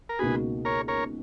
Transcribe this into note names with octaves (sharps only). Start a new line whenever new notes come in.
A#4
C#2 B2 A#3 D#4 F#4 G#4 B4
A#4 C#5
A#4 C#5